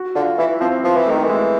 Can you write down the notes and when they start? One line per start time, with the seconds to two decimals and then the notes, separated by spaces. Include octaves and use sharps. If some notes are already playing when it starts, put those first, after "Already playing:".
Already playing: F#4
0.15 D3 F4
0.38 E3 E4
0.60 F3 C4
0.84 F3 B3
0.96 E3
1.06 D#3 A3
1.24 E3
1.29 G#3